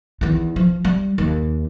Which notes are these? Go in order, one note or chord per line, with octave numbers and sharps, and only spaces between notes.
E2 D#3
F3
G3
D#2